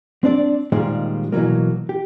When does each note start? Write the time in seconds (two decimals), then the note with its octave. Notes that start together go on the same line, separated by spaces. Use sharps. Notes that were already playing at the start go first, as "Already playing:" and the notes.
0.24 C4 D4 D5
0.72 A#2 D#3 F3 G3 G#3
1.32 B2 E3 F#3 A#3
1.89 G4